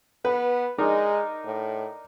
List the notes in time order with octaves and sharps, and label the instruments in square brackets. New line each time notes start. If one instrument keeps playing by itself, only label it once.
[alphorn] B3 [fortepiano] B4
[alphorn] G#3 [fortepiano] D4 D#4 A#4
[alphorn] A2